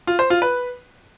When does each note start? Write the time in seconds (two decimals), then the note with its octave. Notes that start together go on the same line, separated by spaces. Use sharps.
0.07 F4
0.19 C5
0.30 F4
0.42 B4